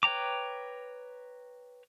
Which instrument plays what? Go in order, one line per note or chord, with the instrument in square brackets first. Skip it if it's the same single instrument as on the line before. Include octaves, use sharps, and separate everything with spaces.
[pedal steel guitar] B4 C#5 G5 A#5 D6